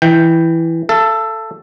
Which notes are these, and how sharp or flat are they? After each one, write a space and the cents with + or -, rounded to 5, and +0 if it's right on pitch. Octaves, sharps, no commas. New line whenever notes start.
E3 +0 G5 +0
A4 +10 F5 -45